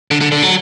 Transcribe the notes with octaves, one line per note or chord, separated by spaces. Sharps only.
D3
D3
D3
F#3